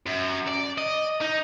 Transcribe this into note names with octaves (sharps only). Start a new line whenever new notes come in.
F#2
D5
D#5
D#4